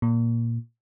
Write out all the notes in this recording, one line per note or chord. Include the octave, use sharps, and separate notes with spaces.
A#2